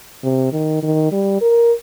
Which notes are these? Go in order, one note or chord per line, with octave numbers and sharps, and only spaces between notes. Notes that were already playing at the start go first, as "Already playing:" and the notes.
C3
D#3
D#3
G3
A#4